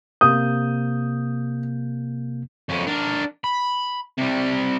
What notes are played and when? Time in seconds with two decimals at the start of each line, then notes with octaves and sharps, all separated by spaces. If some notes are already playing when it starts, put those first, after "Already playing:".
0.21 C3 A#3 D#6 G6
2.69 F2 C#4
2.87 D4 A#4
3.44 B5
4.18 C3 G3